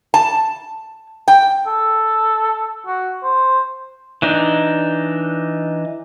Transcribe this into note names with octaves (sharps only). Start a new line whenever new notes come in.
A5
G5
A4
F#4
C5
E3 D4 D#4